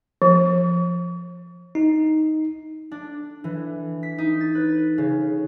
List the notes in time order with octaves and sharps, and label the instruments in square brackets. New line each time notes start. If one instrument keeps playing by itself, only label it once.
[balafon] F3
[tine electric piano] D#4
[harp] D4
E3
B6
D#4
A6
B4
C#3